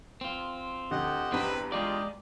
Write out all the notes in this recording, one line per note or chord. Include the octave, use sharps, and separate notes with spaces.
C4 F4
D2 G4 D#5 F#5
E2 G2 C4 B4
G#3 F4 G#4 D5 D#5 G5